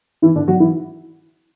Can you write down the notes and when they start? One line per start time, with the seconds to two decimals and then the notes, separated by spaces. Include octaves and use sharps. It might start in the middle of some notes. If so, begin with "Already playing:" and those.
0.22 E3 E4
0.36 D3 D4
0.48 F#3 F#4
0.60 E3 E4